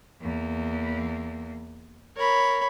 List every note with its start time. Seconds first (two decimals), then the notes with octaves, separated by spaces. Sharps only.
0.21 E2 A#3
2.17 A#4 C#5 B5